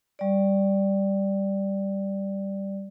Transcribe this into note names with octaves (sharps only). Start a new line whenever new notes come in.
G3 D5